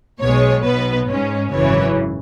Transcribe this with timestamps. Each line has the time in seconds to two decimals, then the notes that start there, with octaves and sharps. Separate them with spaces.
0.21 B1 B2 G#3 C#5
0.64 B1 B2 B3 B4
1.07 G#2 G#3 C#4 C#5
1.52 G#1 F#2 C#3 E3 C#5